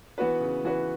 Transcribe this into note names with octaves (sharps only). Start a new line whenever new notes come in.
E3 B3 F#4 B4
C#3
E3 B3 F#4 B4